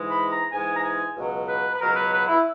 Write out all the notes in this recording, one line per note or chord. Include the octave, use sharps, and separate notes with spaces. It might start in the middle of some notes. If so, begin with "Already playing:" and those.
Already playing: G#2 E3 G#3
B5
A#5
G#2 E3 G#3 G#5
A#5
G#5
C#2 B2 F#3
B4
B4
C#2 B2 F#3 A#4
B4
B4
E4